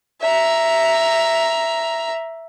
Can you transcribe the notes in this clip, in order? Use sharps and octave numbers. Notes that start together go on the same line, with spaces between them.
E5 A#5